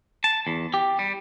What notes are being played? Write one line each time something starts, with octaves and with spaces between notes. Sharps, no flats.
A5
E2
G4
G3